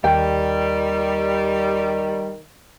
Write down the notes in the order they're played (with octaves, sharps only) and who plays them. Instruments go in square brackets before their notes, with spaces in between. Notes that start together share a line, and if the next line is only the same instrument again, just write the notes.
[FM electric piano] D#2 [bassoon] D#3 [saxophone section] G3 [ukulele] G5